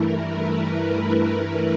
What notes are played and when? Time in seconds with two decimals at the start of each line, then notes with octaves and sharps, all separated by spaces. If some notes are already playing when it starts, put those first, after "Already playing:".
Already playing: G2 E3 A3 E4 A#4
0.25 B4